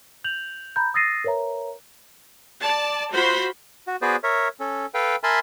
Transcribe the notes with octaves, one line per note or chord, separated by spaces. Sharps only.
G6 F7 F#7
A#5 B5 G6
D#6 E6 A6 A#6 C7 D#7
A#4 B4 C#5 E5 A#5
D5 A5
F4 F#4 C5 B5
F#4
B3 F#4 G#4 B4 C5 D5
A#4 C#5 E5
C#4 A4
A4 B4 F5 G5
A#4 E5 G#5 A5 B5 C6